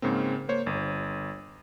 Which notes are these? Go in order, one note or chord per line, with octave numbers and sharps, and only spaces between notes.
G#2 C#3 A#3 C4
A#3 C5 C#5
G1